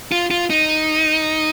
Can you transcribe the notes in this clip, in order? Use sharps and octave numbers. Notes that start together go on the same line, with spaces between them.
F4
F4
D#4